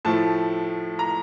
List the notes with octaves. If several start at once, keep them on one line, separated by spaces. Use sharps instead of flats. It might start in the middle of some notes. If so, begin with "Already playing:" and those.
A2 F3 A3 A5
A#5